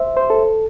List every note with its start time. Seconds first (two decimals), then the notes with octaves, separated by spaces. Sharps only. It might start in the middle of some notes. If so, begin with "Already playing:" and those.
Already playing: C5 E5
0.17 C5
0.30 A4